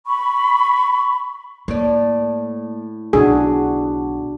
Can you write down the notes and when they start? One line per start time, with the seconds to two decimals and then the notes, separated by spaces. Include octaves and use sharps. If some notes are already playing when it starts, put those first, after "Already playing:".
0.07 B5 C#6
1.68 A2 A#3 D5
3.13 B1 D4 F#4 G#4